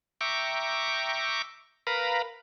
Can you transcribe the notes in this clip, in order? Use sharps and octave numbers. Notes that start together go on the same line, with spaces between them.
E5 G5 A#5 C#6 D6
A#4 B4 F5 A#5 B5